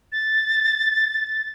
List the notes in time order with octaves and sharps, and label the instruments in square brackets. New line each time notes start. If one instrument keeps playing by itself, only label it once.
[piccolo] A6